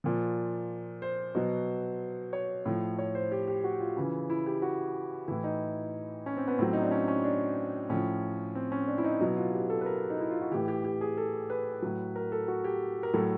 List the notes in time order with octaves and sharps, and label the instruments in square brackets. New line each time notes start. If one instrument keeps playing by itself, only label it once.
[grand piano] A#2 F3
C5
B2 F#3
C#5
A2 F3
C#5
C5
G4
G4
F#4
F4
C#3 E3
E4
G4
F#4
A2 E3 E4
D#4
C#4
C4
B3
A2 F#3 C4
D#4
D4
C#4
C#4
D4
A2 F3 C#4
C4
C#4
D4
E4
D#4
B2 F#3 E4
F4
G4
A4
B4
A#4
D#4
E4
F4
F#4
A2 E3 G4
G4
G4
G#4
A4
B4
A2 F#3
A#4
A4
F#4
G4
A#4
A2 F#3 A4